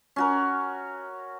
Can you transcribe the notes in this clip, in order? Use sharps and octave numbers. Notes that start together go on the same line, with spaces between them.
C#4 F#4 A#4